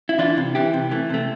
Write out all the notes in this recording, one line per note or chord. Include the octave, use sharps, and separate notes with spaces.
E4
E3 D4 F4
C3
E3 E4 G4
C3
E3 A3
C3 A3